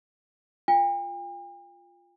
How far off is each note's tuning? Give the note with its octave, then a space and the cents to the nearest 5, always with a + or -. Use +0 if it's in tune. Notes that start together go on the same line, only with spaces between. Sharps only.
F4 +0 G5 +45